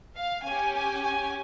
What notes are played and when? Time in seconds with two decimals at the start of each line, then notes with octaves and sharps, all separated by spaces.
0.15 F5
0.43 C#4 G4 G#5
0.72 G#5
1.01 G#5